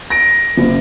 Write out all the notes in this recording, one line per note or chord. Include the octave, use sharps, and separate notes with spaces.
A#6 D7
F#1